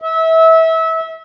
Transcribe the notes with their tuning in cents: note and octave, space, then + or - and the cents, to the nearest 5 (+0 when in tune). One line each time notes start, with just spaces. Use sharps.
E5 -25